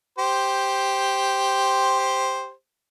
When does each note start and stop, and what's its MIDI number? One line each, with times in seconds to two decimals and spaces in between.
0.18 2.51 67
0.18 2.51 72